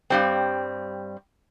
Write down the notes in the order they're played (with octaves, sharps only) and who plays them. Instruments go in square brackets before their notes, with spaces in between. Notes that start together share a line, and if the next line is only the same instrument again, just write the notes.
[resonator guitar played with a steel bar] G2 G3 C4